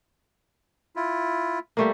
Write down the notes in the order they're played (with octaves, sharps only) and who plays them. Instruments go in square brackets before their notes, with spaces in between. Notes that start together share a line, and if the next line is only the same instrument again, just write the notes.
[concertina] E4 F4
[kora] G3 A3 A#3